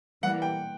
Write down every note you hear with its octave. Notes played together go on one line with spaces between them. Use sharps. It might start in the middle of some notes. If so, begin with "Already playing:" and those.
E3 G3 A#3 F#5
G5